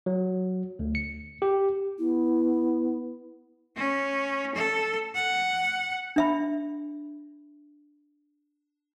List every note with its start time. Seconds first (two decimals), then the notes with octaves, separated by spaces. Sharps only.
0.06 F#3
0.79 D2
0.95 C#7
1.42 G4
1.99 B3 E4
3.76 C#4
4.55 A4
5.15 F#5
6.16 D4 E5 B5